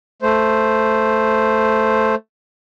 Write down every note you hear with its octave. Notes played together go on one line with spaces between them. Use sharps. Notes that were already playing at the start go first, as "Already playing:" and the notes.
A3 C5